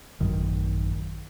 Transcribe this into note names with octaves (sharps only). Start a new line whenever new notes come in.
A1 F#2 D#3